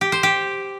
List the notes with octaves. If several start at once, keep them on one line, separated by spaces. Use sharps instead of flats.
G4
C5
G4